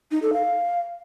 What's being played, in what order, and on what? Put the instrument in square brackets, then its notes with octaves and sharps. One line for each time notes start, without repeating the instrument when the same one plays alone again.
[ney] D#4
A4
F5